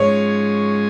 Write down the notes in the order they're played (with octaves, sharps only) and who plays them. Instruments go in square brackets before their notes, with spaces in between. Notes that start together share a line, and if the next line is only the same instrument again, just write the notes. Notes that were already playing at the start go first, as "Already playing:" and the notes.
Already playing: [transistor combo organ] G#2 F3 G#3 C#4 G#4 [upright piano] C#5